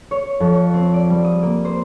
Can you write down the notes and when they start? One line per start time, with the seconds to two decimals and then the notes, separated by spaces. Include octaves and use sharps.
0.11 C#5
0.40 F2
0.52 C#5
0.74 C4
0.94 D5
1.10 G3
1.25 D#6
1.43 A#3
1.65 C5